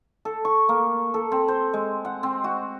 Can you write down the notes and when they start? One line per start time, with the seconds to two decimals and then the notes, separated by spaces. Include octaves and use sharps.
0.25 A4
0.45 C#6
0.69 A#3
1.14 A4
1.32 C4
1.48 C5
1.74 G#3
2.05 F#5
2.23 C4
2.44 F#4